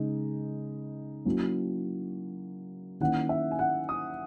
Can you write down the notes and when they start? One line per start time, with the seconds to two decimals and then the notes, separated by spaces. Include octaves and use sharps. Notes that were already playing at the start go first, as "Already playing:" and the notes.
Already playing: C#3 G#3 D#4
1.25 F#3 A#3 C#4 E4
3.00 D#3 A#3 C#4 E4 F#5
3.29 E5
3.51 G#5
3.59 F#5
3.89 D#6